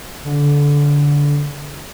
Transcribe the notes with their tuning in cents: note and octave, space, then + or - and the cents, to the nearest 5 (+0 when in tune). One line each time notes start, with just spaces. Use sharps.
D3 -20